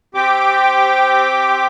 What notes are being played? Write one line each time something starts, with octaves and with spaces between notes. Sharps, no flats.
C4 G4 G5 D6